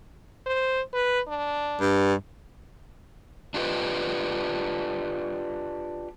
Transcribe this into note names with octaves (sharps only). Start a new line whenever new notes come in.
C5
B4
D4
G2
D4 F4 G4 B4 D#5